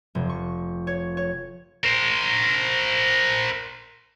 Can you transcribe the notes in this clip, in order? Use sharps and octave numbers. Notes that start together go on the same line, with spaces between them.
F1
C#6
C#5
C#5
A#4 C5